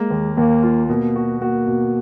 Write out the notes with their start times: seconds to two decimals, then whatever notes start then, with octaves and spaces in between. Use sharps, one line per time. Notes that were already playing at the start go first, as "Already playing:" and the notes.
Already playing: G#3 A#3
0.10 D#2
0.37 D#2 A#3
0.63 F4
0.89 B2 A#3
1.16 F#4
1.41 A#3 F#4
1.67 B2